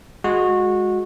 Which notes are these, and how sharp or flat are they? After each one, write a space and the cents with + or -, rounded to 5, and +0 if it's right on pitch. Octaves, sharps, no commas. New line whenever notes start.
G#3 +0 F#4 -20